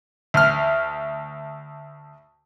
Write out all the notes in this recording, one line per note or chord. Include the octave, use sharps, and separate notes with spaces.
D2 F6